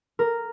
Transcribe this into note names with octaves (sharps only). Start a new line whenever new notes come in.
A#4